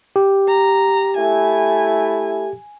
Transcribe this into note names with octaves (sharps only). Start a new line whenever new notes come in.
G4
A#5
A3 E4 G#5